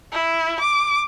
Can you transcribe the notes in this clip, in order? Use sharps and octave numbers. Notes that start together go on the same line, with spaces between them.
E4
D6